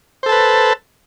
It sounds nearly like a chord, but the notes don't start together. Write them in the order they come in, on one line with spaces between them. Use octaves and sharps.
C5 A4 A5 B4